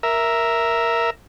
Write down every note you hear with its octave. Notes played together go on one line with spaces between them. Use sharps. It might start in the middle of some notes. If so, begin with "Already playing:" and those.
A#4 E5